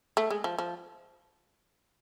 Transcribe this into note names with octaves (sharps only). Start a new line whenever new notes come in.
A3
G#3
F3
F3